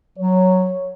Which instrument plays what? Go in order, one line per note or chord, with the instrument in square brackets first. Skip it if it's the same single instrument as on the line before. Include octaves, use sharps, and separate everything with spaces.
[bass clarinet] F#3 [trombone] C#5